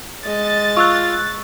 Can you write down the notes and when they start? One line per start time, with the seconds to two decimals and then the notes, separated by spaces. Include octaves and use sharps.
0.24 G#3 D#5 A6
0.77 F4 C#6 E6 F#6